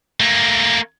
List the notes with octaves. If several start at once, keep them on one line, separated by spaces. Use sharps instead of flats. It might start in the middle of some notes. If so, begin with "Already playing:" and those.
A3 A#3